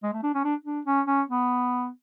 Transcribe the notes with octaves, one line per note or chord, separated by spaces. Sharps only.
G#3
A3
D4
C#4
D4
D4
C#4
C#4
B3